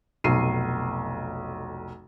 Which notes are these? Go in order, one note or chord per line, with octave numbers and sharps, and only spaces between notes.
F1 B1 C7 D#7